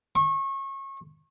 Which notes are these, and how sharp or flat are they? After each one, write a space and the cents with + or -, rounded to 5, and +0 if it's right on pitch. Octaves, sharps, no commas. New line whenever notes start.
C#6 -30